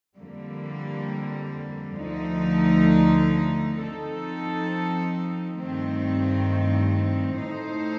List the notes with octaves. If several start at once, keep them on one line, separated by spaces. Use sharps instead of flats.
F2 D3 G3 A#3
D2 D3 F3 A3 D#4
F3 C4 D#4 A4
G2 D#3 A3 C4
A2 A3 D#4 A4 C5